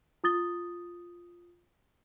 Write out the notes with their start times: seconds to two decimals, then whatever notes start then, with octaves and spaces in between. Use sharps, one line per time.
0.24 F4 D#6 A6 G7